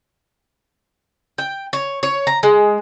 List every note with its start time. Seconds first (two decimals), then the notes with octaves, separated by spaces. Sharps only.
1.38 G5
1.73 C#5
2.03 C#5
2.27 A#5
2.43 G#3